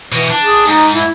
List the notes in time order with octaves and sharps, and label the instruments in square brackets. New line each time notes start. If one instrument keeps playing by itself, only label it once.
[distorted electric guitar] B2 [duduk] E3
[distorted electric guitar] D4
[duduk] G#4
[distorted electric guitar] G#2 [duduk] D#4
[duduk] E4